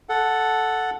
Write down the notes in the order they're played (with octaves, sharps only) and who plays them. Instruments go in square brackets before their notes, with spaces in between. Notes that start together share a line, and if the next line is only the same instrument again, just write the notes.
[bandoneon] A4 F#5